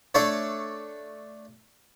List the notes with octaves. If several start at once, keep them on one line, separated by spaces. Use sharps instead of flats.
A3 D4 A4 C#5